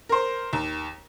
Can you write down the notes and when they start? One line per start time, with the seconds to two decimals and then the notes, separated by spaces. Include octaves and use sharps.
0.09 A#4 C5
0.53 D#2